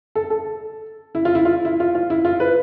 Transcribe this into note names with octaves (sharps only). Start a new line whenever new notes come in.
A4
A4
E4
F4
E4
F4
E4
F4
F4
E4
F4
B4